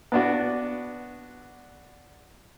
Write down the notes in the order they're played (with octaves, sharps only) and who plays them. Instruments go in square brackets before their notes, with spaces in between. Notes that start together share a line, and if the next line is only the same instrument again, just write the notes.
[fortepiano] B3 D4 F#4